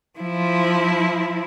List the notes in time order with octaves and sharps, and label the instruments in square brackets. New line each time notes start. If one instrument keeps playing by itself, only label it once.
[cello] F3 E4